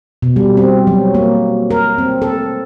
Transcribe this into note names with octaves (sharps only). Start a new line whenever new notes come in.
B2
G3
C4
F#3
A#3
A#4
C4
A4